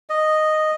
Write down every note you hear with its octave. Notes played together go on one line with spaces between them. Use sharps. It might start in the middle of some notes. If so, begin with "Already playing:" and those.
D#5